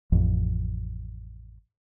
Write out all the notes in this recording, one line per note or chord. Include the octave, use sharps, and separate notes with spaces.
A1 F2